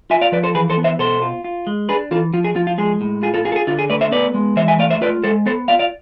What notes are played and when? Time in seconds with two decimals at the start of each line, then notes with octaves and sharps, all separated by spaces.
0.10 F4 E5 G#5
0.21 D5 F5
0.32 F3 B4 D5
0.43 A4 C5
0.54 E3 G#4 B4
0.70 A4 C5
0.77 B3
0.84 C5 E5
0.99 B2 A4 C5
1.22 F4
1.44 F4
1.67 G#3
1.89 D4 G#4 B4
2.11 E3 F4 A4
2.33 F3 F4
2.44 G#4
2.56 F3 F4
2.67 F4
2.78 G#3 G#4
3.01 A2
3.23 F4 G#4
3.34 F4 A4
3.45 F4 G#4
3.52 A4
3.56 G#4
3.67 D3 F4
3.79 G#4
3.90 A3 B4 D5
4.01 C5 E5
4.12 B3 B4 D5
4.34 G#3
4.56 E3 C5 E5
4.68 E5 G#5
4.79 A3 D5 F5
4.90 C5 E5
5.01 F4 B4 D5
5.24 G#3 A4 C5
5.46 B3 A4 C5
5.68 F4 D5 F5
5.79 D5 F5